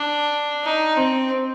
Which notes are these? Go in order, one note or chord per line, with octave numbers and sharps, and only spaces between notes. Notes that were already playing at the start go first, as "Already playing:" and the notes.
Already playing: D4
D#4
C4